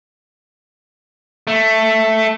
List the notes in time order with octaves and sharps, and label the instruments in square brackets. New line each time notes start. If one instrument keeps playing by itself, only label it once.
[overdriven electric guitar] A3